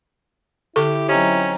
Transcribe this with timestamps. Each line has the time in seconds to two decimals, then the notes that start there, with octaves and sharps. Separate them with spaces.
0.76 D3 E4 G4 A4 C#6
1.09 F#3 C4 C#4 D#4 G4